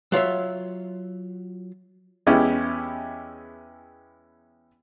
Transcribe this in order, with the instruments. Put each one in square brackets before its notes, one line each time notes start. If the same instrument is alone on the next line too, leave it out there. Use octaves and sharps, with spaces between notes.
[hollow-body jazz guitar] F#3 F4 C#5 E5
[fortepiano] E2 G#3 B3 C#4 E4 G4